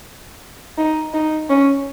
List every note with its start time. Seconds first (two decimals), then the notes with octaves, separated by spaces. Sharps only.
0.78 D#4
1.14 D#4
1.50 C#4